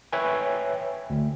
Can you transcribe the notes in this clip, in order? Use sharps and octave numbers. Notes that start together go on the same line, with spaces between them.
B4 C#5 E5 G5 G#5
D2